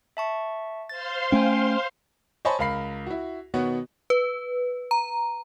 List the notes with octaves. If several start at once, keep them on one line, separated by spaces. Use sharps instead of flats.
E5 A5 C#6
C5 F5 C6 A6
A3 C#4 G5 G#5
C5 C#5 D#5 G#5 A5 B5
C#2 A#4 F5 B5 C7
E4 F#4
B2 D#3 B3 F#4 C#5
B4
A#5